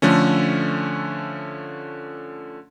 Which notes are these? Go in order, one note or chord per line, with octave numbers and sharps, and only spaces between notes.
D3 F3 A3 C#4